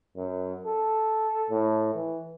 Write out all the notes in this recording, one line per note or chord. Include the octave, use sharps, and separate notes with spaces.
F#2
A4
A2
E3